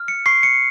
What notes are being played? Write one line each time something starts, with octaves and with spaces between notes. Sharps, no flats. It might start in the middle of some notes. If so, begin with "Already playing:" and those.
Already playing: F6
C#7
C#6 C7
C#7